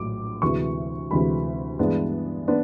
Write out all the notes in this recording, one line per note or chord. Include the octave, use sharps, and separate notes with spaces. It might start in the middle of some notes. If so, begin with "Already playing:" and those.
Already playing: A#1 A2 F#3 D6
D2 C3 E3 G#3 C#6
D2 C3 E3 G#3 B5
G2 E3 G#3 B3 D4
B3 D4